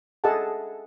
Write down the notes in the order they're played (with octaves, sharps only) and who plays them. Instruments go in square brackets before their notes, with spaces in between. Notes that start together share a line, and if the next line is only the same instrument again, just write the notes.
[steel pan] G#4 A4 D#5 E5 F#5 A5